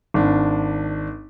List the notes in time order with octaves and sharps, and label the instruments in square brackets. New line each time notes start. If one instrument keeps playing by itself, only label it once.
[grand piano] G#1 D4